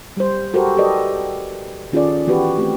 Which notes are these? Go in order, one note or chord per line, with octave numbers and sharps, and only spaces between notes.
G3 C5
F#4 G4 A4 A#4 C5
G4 A4 B4 D5 D#5
D#3 C#4 F4 G#4 A4 D5
E3 B3 F#4 G4 B4
A3 C4 G4